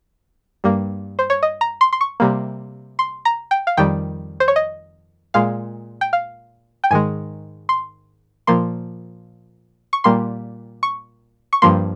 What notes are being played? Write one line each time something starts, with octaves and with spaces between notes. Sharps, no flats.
G2 G3 A#3
C5
C#5
D#5
A#5
C6
C6
C#6
C3 G3 A#3
C6
A#5
G5
F5
F2 D#3 G3 G5
C5
C#5
D#5
A#2 G#3 F5
G5
F5
G5
G#2 D#3 G#3 G#5
C6
A#2 F3 A#3 C6
C#6
A#2 G3 A#3 C6
C#6
C#6
G2 F3 A#3 C6